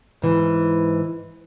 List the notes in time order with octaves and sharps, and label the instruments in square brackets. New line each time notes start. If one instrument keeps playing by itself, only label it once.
[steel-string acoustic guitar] G#2 E3